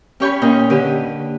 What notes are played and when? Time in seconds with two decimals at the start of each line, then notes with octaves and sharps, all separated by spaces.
0.20 C#4 G4 C#5 G5 G#5 B5
0.42 A#2 C#4 D#4
0.70 D3 G4 B4